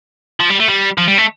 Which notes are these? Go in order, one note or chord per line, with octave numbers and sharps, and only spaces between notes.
F3
G3
A3
G3
F3
G3
A3